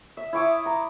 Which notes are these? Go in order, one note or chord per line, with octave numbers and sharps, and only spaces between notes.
E5
E4 C#5 D6 D#6
A#5 D6